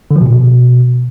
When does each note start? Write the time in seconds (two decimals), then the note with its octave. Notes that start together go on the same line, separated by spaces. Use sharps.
0.11 D3
0.16 F3
0.21 B2
0.26 A#2
0.31 B2